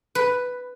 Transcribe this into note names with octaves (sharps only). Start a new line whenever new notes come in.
B4